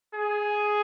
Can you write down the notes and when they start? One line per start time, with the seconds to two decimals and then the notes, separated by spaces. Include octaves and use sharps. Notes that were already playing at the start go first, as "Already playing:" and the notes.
0.15 G#4